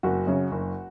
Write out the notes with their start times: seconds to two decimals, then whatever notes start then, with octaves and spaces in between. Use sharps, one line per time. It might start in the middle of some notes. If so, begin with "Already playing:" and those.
0.03 F#1 F#4
0.27 F#2 C#3
0.52 F#1